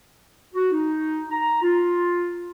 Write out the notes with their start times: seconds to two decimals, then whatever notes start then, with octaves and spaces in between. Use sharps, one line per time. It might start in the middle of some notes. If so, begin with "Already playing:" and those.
0.54 F#4
0.72 D#4
1.30 A#5
1.62 F4